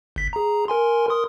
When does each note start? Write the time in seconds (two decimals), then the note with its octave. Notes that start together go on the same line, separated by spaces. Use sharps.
0.16 G1 B6
0.33 G#4 A#5
0.68 A#4 G#5 C6
1.09 A#4 C6 D#6